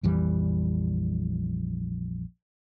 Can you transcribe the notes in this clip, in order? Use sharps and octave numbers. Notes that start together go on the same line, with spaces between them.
A#1 F2 E3 G3